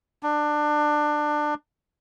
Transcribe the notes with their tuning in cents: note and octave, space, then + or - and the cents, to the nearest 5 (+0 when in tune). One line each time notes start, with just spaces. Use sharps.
D4 +20